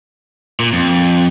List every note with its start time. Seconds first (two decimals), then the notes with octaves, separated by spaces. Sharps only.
0.60 A#2
0.73 F2